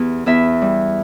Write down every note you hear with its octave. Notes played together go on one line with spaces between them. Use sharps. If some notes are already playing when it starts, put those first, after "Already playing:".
Already playing: E2 G4
E2 E4 E5
G3